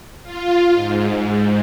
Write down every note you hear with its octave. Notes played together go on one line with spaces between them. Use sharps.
F4
G#2